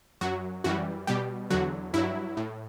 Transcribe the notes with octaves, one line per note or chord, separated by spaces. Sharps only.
F#2 F#3 F#4
F#2 E3 G3 F#4
B2 G3 G4
E2 D3 F#3 F#4
G2 F#3 E4
A2